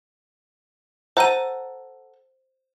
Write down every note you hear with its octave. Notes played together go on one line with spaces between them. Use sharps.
A4 C5 F#5 A#5 D#7